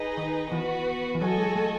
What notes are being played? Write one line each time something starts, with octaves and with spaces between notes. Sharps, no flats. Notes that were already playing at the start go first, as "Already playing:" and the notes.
Already playing: D#4 G#4 B4 D#5
D#3
E3 B3 F#4 B4
E3
F#3 F#4 A4 D#5 G#5
G#3
A3